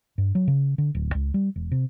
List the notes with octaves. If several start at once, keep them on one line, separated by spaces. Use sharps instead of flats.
G2
F#3
C#3
D3
D1
C#2
G3
E1
C3